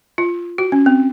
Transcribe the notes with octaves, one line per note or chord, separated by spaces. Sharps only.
F4
F#4
C#4
C4